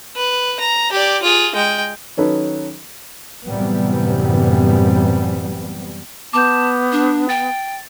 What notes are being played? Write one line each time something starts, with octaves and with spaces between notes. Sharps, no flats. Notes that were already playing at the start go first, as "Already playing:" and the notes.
B4
A#5
G4 D5
F4 G#4
G#3 G5
D#3 F#3 C#4 D#4 A4 B4
F#2 A2 C3 E3 G3 B3
B3 A5 D6 G6
D4
G5 A6